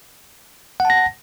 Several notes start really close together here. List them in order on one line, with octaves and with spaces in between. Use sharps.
F#5 A5 A#6